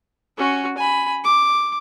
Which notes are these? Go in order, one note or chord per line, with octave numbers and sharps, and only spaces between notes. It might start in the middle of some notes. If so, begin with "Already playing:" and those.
C#4 F#4
G#5 B5
D6